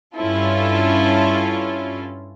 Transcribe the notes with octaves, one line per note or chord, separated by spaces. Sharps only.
G2 C#4 E4 F4 A4